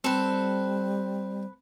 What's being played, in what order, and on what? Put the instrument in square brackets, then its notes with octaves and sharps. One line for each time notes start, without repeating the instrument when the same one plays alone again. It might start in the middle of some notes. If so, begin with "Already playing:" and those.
[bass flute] G3 [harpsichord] C4 [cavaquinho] A4 B4